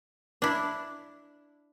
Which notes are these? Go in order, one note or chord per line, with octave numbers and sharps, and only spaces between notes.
D4 E4